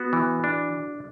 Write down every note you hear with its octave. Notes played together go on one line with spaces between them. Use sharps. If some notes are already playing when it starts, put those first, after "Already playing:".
Already playing: B3 F#4
E3
D4